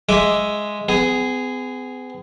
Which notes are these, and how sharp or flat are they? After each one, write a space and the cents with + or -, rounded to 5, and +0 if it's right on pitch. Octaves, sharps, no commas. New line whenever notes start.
G#3 +0 E5 +0 D6 +0
B3 +45 G#4 +0